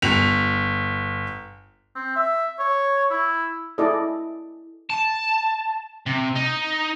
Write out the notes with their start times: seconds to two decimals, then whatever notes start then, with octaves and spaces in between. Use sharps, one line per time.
0.02 G1 F7
1.95 C4
2.16 E5
2.59 C#5
3.10 E4
3.78 E4 G#4 A4 D5 D#5
4.90 A5
6.06 C3
6.35 D#4